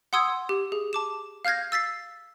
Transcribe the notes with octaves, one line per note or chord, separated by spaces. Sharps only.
F#5 C6 D#6 E6 G#6
G4
G#4
A5 D6 E7
F5 F6 G6 G#6 A#6
E6 A6 B6 C7